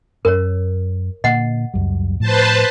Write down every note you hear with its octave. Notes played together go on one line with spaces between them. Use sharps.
F#2 C#4 A#4 C#5
A#2 D3 A#3 D#5 F#5
C#2 F#2 G3
A2 F3 B4 C5 A5